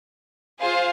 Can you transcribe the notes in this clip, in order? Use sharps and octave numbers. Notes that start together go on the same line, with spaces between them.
F4 G#4 C5 F5